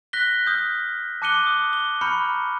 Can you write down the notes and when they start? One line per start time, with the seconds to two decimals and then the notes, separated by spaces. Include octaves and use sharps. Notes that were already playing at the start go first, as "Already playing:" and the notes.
0.13 F#6 A#6 B6 G7
0.46 D#6 F6 G6
1.22 A5 D6 F#6 C#7 D#7 G7
1.46 D#6
1.73 G7
2.01 A#5 B5 C#6 F6 G6 C#7